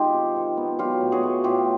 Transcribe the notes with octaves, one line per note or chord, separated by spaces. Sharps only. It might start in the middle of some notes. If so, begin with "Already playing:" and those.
Already playing: D#3 G#3 D#4 F4 G4
C3
D#3
B3
F#3 F4 G4
A2
F#4 G#4
A3
A2 F4 G4